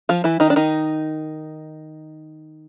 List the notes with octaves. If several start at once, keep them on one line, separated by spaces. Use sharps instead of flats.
F3 F4
E3 E4
D#3 D#4
D4
D#3 D#4